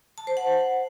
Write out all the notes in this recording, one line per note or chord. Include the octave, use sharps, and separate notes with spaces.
A5
C5
F#5